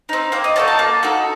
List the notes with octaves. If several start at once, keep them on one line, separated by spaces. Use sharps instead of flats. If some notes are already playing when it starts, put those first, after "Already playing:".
C4 D#4
A#3 G5
D#5
D#4 F#4 A4 D5
A5
A#3
D#4 F#4 A4